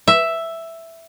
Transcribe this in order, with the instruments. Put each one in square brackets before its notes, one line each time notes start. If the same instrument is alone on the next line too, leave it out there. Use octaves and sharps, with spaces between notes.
[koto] E5